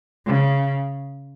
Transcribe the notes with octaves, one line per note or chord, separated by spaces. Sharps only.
C#3